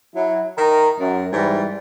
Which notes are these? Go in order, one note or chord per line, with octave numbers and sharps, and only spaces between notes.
F#3 E4
D#3 A#5
F#2
G#2 E3 G3